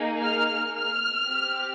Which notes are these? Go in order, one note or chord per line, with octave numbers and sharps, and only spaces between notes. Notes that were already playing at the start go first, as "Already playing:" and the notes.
Already playing: A#3 D#4 G#4
F6
F6
C4 G4